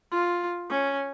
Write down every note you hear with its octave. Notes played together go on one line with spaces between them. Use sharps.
F4
C#4